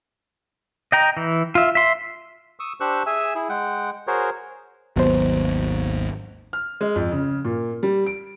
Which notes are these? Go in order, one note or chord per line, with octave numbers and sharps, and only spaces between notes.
D#5 G5 A#5
E3
F4 E5
E5 C6
C#6 D#6 E6
D4 G4 C5 C#6 E6 F#6
G#4 E5 G#5 E6
E4 G#4
G#3 F#5 G5
F#4 G#4 A#4 C5 C#5
G#1 D#2 F#3 B3 C5
F6
G#3
F2
C#3
A#2
G3
D7